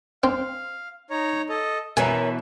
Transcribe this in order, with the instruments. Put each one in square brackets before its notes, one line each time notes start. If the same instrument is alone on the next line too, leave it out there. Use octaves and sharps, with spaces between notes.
[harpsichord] C4 [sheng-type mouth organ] F5
[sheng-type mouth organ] D#4 C#5 A#5
A4 D#5
[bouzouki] B2 E3 B3 [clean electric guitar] A#4 C#5 A#5 [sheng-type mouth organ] E5 [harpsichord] G#5